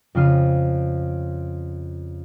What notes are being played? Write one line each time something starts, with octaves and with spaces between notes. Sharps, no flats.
F2 C#3 F4 F6 D#7